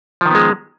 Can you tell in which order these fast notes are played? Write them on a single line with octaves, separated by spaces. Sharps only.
F3 D#3 B3 G#3